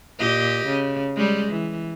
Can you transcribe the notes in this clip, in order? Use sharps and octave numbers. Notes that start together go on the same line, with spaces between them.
A#2 G4 D#5
C#3
G3 G#3
E3